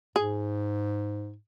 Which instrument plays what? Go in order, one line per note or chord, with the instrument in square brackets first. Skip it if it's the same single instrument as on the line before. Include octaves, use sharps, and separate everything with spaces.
[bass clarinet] G#2 [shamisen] G#4